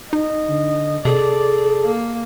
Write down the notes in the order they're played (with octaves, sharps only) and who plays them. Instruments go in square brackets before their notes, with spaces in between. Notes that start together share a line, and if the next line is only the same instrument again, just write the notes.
[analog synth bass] D#4 [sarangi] D#5
[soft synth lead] D3
[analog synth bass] C3 [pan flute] G#4 [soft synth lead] A4 [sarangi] D5
[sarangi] A#3